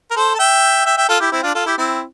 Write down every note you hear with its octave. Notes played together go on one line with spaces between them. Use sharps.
A#4
A4 C5
A5
E5 G5
E5 G5
E5 G5
F4 A4
E4 G4
C4 E4
D4 F4
F4 A4
E4 G4
C4 E4